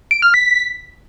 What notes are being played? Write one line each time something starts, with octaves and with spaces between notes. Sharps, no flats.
D7
F6
B6